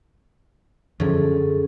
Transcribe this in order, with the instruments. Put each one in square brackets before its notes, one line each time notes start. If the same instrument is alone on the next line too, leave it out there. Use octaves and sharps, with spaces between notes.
[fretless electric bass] F#2 D3 F3 [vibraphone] C#4 G#4 A4